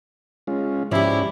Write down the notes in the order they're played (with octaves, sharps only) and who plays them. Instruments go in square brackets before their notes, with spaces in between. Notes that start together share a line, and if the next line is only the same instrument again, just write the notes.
[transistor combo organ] G#3 C#4 F4
[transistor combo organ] G#2 C#4 D5 [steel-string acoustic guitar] F3 G4 [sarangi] E4